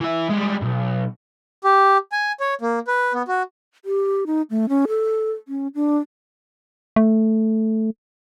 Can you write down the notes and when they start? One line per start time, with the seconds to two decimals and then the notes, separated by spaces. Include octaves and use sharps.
0.01 E3 E5
0.30 G3 G#3
0.62 B1 G#2
1.64 G4
2.12 G#5
2.40 C#5
2.62 A#3
2.87 B4
3.14 B3
3.28 F#4
3.85 G4
4.27 D#4
4.50 A3
4.69 C#4
4.88 A4
5.48 C#4
5.75 D4
6.96 A3